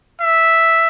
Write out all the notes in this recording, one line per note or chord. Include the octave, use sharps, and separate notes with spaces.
E5